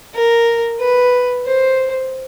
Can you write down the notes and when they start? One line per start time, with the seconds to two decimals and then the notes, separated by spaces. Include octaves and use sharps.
0.15 A#4
0.80 B4
1.45 C5